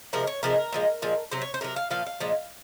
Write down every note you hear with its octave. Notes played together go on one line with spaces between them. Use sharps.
C3 F3 G#3 A#4
C#5
C3 F3 G#3 A#4
A#2 F3 G#3
A#2 F3 G#3
C3 F#3 C5
C#5
C5
C3 F#3 A#4
F5
A#2 F3 F5
F5
A#2 F3 G#3